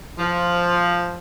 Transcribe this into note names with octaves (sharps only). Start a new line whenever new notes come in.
F3